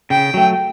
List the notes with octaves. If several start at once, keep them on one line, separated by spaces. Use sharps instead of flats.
C#3 G5
F#3 A3